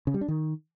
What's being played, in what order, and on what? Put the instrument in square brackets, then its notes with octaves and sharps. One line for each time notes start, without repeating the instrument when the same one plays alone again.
[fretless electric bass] C#3
G3
D4
D#3